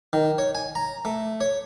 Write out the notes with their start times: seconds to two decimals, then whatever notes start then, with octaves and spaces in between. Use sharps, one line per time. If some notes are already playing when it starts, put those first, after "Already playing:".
0.13 D#3
0.38 C#5
0.55 G#5
0.75 A#5
1.05 A3
1.41 C#5